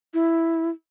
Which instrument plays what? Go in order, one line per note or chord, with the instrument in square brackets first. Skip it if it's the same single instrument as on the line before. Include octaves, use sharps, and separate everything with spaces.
[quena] E4